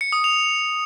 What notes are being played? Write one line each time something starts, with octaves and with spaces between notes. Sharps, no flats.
C#7
D#6
F7